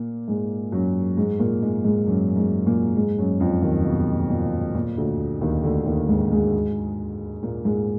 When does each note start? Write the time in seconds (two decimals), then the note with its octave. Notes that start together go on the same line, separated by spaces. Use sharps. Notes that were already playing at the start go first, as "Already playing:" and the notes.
Already playing: A#2 A#3
0.27 G#2 G#3
0.72 F#2 F#3
1.17 G#2 G#3
1.39 A#2 A#3
1.62 G#2 G#3
1.84 G#2 G#3
2.06 F#2 F#3
2.36 G#2 G#3
2.67 A#2 A#3
2.96 G#2 G#3
3.18 F#2 F#3
3.40 F2 F3
3.62 D#2 D#3
3.85 B2
4.30 A#2
4.74 A#2
4.97 D2 D3
5.41 D#2 D#3
5.64 D2 D3
5.86 D#2 D#3
6.08 G#2 G#3
6.31 G#2 G#3
7.43 A#2 A#3
7.65 G#2 G#3